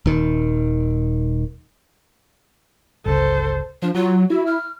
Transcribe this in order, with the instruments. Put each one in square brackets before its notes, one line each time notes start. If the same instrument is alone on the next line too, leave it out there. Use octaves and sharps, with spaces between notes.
[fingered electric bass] D#1 D#3
[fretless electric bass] G1 C#2 [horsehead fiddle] A4 C5
[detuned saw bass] F3 [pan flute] D4
[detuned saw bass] F#3 [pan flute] F4
[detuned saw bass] E4 [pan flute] F#4
[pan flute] F6